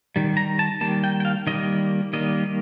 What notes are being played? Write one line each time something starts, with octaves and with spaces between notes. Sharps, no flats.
D#3 G3
A#5
A5
D#3 G3 A#3 A5
G5
G5
F5
D#3 G3 A#3 D#5
D#3 G3 A#3 D#5